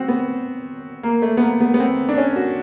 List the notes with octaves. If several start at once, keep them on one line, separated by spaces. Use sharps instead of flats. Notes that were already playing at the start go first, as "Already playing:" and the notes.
Already playing: C4 F#4
B3
A#3
A3
B3
A#3
B3
B3
C4
D4
C#4
F#4